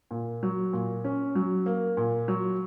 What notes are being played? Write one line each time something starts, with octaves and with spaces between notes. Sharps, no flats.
A#2
F#3
A#2
C#4
F#3
A#3
A#2
F#3